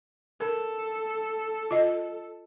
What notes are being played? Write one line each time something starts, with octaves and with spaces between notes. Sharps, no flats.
A4 A#4
F4 D#5